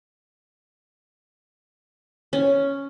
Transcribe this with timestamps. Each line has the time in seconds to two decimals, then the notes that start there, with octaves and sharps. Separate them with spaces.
2.33 C#4